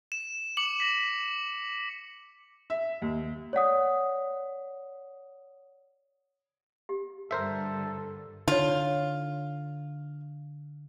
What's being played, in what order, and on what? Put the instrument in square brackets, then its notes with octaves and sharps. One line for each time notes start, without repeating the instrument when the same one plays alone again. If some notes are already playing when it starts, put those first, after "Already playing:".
[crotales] E7
D6 C#7 E7 F#7
A#6 B6
[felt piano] E5
D#2
[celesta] C#5 D5 F#5 D#6
[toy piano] G4
[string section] G2 D3 [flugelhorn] A4 [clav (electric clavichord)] A#4 C5 E5
[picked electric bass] D3 [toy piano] D#4 C#5 [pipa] F4